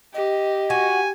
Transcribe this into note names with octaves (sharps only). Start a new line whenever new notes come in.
G4 D#5
F#4 G#5